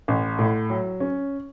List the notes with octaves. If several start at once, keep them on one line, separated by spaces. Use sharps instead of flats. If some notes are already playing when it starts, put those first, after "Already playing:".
A1
A2
F#3
C#4